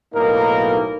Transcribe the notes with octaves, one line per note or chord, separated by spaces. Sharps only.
B1 A2 A#3 D#4 A#4